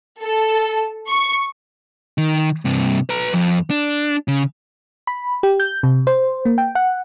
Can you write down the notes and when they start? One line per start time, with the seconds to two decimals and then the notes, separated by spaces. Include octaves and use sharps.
0.21 A4
1.08 C#6
2.18 D#3
2.65 G2 C3
3.09 B4 A#5
3.33 F2
3.70 D4
4.28 C#3
5.07 B5
5.43 G4
5.60 G6
5.83 C3
6.07 C5
6.45 A#3
6.58 G5
6.75 F#5